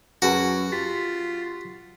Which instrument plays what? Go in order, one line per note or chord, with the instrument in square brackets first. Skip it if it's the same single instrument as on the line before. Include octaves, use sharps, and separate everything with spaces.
[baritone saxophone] F#2 [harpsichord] F#4 [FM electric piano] G#4 B4 A5
[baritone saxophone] F4 [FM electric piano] G4 A6 B6